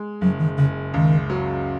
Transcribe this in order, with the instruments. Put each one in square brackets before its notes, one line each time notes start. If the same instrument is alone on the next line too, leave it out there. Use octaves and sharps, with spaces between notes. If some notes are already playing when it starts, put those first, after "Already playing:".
Already playing: [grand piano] G#3
[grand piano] F#1 [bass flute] F#3
[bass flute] D#3
[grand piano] F#1 [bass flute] C#3
[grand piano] C#2 [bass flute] D#3
[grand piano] F#3